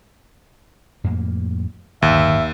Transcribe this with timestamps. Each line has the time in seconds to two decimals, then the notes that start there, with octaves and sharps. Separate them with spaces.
1.04 F2 A2 A#3
2.02 D1 G1 D#2 D#3 E5